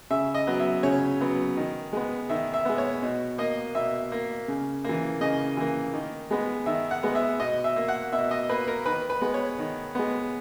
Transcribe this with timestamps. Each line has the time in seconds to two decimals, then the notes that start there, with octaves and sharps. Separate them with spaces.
0.10 C#3 E5
0.34 D#5
0.47 F#3 B3
0.59 E5
0.83 C#3 C#5
1.21 F#3 B3
1.57 D#3
1.93 G#3 B3
2.29 D#3 E5
2.54 E5
2.65 G#3 B3
2.78 C#5
3.02 B2
3.38 A#3 D#5
3.75 B2 E5
4.12 A#3
4.48 C#3
4.84 E3 A#3
5.21 C#3 D#5
5.57 E3 A#3
5.93 D#3
6.31 G#3 B3
6.66 D#3 E5
6.91 F#5
7.03 G#3 B3
7.15 E5
7.39 B2 D#5
7.64 E5
7.76 A#3
7.88 F#5
8.13 B2 E5
8.31 D#5
8.49 A#3 B4
8.68 A#4
8.86 D#3 B4
9.10 B4
9.21 G#3 B3
9.34 C#5
9.59 D#3
9.95 G#3 B3